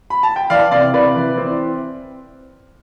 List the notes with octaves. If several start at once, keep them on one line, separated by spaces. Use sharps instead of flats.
B5
A5
G5
E3 D5 F5
C3 D5 F5
C3 B4 D5
E3
C4